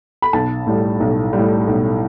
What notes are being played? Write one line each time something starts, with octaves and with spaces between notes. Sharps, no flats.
B5
B1 A5
A2 G3
B1
G3
A2
B1